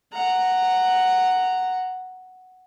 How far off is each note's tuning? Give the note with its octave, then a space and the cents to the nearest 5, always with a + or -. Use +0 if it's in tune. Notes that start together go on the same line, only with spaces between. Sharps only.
F#5 +0 A#5 -5